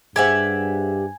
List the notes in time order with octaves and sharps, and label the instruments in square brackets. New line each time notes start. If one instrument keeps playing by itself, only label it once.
[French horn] G2 [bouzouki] G4 E5 F#5 [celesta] G#4 C5 [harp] G#5